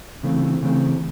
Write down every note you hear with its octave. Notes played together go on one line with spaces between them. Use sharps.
C#3 E3 A3 C4
C#3 E3 A3 C4